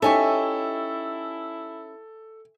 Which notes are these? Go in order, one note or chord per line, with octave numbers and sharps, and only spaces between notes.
C#4 D#4 E4 G4 A4 E5 G#5 C#6